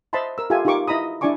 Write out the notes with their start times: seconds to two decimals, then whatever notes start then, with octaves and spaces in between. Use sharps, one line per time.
0.13 C5 D#5 E5 A5 B5 C6
0.38 A#4 E6
0.50 F4 G4 A4 E5 G#5
0.65 D#4 F4 G4 A#4 C#6 D6
0.88 E4 D#5 A#5 B5 D#6
1.21 D4 E4 D5 G#5 C#6 D6